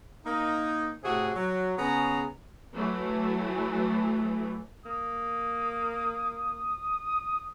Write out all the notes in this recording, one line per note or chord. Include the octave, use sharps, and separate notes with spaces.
A#3 D#4
A2 C3 F#4 G#4
F#3
C#3 B3 C#4 G#4 A#5
E3 F#3 A3
A#3 D#6